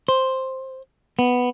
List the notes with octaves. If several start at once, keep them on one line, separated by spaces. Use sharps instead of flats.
C5
B3